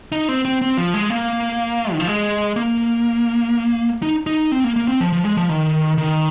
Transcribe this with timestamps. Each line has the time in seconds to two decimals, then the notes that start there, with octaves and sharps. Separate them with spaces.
0.12 D#4
0.29 C4
0.45 C4
0.62 C4
0.78 F3
0.94 G#3
1.10 A#3
1.92 D#3
2.00 F3
2.07 G#3
2.56 A#3
4.02 D#4
4.27 D#4
4.52 C4
4.64 A#3
4.76 A#3
4.88 C4
5.01 F3
5.13 F3
5.25 G#3
5.37 F3
5.49 D#3
5.98 D#3